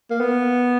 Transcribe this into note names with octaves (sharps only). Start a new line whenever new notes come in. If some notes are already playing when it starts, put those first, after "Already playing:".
A#3
B3